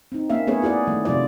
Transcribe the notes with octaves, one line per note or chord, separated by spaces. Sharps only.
C4 D#4
A#3 C#4 E5 F5
A3 B3 C#4 G#4 B4 C#5
E4 F#4 G#4 D5
D#3 A3
C3 F#3 F4 D5